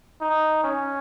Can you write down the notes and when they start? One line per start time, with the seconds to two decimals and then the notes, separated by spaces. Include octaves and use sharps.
0.21 D#4
0.64 C#4